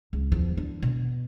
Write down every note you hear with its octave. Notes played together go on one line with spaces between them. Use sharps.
C#2
E2 F3
D3
B2